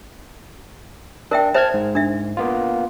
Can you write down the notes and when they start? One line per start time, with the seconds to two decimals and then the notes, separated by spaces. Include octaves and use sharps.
1.31 D4 A#4 E5 G5
1.54 C5 E5 A5 F6 G#6
1.74 G#2
1.95 D4 E5
2.37 A#3 B3 F4